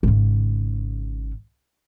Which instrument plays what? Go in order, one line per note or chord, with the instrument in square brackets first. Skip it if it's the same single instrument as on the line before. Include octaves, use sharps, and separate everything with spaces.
[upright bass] G#1 C#3